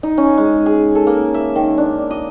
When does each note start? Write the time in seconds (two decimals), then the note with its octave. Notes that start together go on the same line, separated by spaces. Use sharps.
0.03 D#4
0.18 C#4
0.38 G#3
0.66 G#4
0.95 A4
1.07 A#3
1.34 E5
1.56 D#3
1.78 D4
2.10 D#5